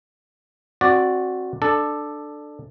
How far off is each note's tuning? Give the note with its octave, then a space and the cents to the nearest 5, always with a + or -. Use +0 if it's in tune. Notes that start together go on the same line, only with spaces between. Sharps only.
C4 +25 F#4 +0 D5 +0
D4 +15 A4 +0